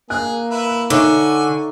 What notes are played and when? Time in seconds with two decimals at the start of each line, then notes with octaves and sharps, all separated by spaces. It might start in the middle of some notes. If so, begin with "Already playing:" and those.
0.10 A#3 G#4 F#6
0.51 E4 B4 E5
0.90 D3 D#4 C#5 E5 G#5 C#6